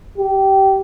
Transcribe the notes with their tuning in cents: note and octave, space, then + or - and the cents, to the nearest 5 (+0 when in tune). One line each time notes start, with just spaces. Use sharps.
G4 -20